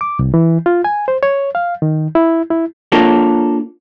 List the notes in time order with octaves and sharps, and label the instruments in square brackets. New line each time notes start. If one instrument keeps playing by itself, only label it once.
[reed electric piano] D6
C2
E3
F4
G#5
C5
C#5
F5
D#3
E4
E4
[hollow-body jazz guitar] A#3 D4 F4 A4 A#4 C#5